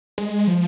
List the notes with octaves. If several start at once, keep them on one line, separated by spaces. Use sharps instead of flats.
G#3
F3